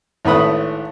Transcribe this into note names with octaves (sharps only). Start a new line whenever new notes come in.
G#1 A2 A3 B4 B5 D#6